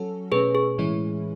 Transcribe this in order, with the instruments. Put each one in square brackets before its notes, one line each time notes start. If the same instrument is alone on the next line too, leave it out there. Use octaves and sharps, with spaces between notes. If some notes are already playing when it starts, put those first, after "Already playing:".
Already playing: [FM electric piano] F#3 C#4 F#4 A4
[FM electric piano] B2 A3 C#4 [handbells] G#4 B4
[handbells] G#4
[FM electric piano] A2 E3 G#3 C#4 E4